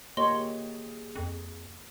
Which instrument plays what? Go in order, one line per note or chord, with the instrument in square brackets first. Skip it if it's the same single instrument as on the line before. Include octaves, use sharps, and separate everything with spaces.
[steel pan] A#3 G4 C#5 [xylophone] D#5 C6
[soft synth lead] G#4
[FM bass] F2